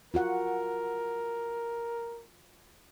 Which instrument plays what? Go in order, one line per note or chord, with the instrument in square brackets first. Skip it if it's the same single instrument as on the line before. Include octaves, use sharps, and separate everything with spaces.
[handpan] F4 F#4 F#5 [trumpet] A#4